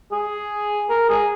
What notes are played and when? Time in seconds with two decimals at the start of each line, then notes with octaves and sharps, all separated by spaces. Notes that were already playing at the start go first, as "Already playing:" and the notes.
0.12 G#4
0.89 A#4
1.09 G#4